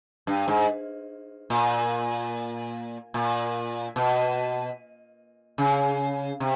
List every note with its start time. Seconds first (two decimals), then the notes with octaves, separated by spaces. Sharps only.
0.27 G2
0.48 G#2
1.50 A#2
3.14 A#2
3.96 B2
5.58 C#3
6.40 C3